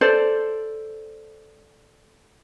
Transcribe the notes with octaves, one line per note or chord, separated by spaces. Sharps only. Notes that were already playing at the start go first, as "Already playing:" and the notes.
A4 C5 D5